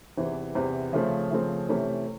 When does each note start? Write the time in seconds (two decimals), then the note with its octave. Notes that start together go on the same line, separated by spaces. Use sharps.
0.17 E2 C3 E3
0.55 E2 C3 E3
0.93 C#3 F3 A3 C4
1.31 C#3 F3 A3 C4
1.69 C3 E3 A3 C#4